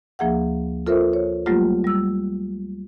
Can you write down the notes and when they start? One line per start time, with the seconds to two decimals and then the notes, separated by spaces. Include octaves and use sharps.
0.19 D2 F3 A#3 G#4 E5 F#5
0.87 F4 A4 A#4 C5 E5
1.13 C#5
1.46 F#3 G3 A3 A#3 F4 G4
1.84 G3 E6